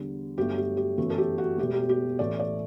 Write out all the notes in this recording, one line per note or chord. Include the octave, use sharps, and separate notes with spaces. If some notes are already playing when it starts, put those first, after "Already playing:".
Already playing: E2 D3 G3
G1 G2 F#3 A3 G4
G4
G4
G1 F#2 E3 A3
A4
G4
F#4
E1 E2 B2 A3 G4
G4
G4
A1 A2 E3 A3 D5
D5